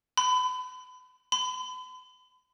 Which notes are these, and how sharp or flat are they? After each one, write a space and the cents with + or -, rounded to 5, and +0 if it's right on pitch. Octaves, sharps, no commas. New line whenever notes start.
B5 +35
B5 +40